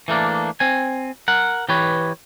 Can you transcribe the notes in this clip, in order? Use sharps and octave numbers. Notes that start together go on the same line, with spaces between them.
E3 A3 A#3 D4
C4 G#5
A#4 F#5
E3 G4 B4 C#5